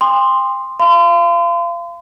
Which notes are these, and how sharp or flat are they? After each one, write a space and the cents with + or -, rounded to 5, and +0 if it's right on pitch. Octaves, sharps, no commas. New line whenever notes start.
G5 +45 C6 +0 D#6 -35
F5 -30 C6 -40